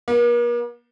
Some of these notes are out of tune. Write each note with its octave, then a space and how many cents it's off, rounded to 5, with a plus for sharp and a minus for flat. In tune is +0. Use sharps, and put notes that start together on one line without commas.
A#3 +45